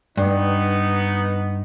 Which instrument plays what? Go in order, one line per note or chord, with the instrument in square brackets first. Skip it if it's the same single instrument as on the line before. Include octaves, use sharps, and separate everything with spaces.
[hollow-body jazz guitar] G2 [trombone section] B3 D#4